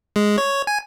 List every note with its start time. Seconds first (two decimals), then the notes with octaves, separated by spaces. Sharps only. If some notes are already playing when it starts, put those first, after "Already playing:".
0.16 G#3
0.38 C#5
0.67 G#5